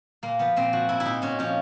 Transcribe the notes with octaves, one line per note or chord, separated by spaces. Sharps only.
A#2 A#3
F3 B3
A#2 C4
F3 F#4
A#2 E4
E4
A#2 D#4
A#2 C#4
F3 C#4